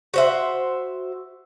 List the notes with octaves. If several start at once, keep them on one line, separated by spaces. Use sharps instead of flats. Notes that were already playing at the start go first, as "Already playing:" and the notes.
F#4 C5 E5